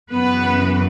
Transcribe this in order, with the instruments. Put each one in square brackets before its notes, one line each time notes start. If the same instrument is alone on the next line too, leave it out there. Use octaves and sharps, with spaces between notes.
[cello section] F#2 C#3 E3 B3 B4